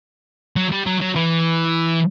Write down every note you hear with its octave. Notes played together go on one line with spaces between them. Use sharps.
F#3
G3
F#3
F#3
E3